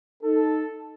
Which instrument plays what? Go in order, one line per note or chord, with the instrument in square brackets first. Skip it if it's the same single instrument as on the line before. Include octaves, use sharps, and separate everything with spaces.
[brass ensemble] D#4 A4